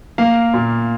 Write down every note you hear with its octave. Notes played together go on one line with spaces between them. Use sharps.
A#3 F5
A#2